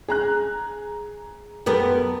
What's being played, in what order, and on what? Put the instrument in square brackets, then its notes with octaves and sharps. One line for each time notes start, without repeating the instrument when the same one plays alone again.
[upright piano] G#4 A#5 F#6
[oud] F#2 B3 A#4 [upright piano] G4 A4